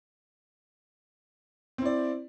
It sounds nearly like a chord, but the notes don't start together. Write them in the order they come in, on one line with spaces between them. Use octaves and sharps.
C4 E4 D5